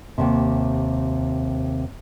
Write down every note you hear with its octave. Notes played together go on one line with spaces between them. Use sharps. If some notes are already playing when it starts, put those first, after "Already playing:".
D#2 C3